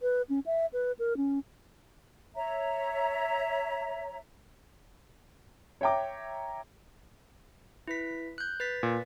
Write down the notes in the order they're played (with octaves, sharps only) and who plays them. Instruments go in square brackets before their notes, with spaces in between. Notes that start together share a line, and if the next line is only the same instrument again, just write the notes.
[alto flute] B4
C#4
E5
B4
A#4
C#4
[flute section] C#5 E5 A#5
[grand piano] C#5 E5 G5 A#5 D6
[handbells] E4 B4 B6
F#6 G6
B4 A6 B6
[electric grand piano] A#2